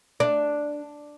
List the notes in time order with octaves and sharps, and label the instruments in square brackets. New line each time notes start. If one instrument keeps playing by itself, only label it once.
[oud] D4